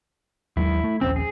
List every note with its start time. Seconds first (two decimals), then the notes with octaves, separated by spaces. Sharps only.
0.57 D#2 F#3 G#3 E4
0.84 A3
1.01 D#1 A#1 C4 C#4
1.16 G#4